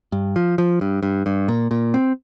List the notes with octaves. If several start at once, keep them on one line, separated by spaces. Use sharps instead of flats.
G2
F3
F3
G2
G2
G2
A#2
A#2
C4